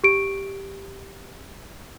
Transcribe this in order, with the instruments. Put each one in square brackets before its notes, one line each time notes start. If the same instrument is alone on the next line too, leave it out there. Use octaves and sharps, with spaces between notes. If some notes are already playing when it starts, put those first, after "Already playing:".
[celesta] G4 D7